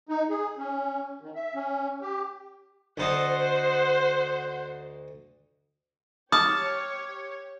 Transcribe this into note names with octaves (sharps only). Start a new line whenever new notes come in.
D#4
G#4
C#4
D#3
E5
C#4
G4
D2 A4 C5 D#5 F#5
G4 C#5 A5 D6 D#6 F6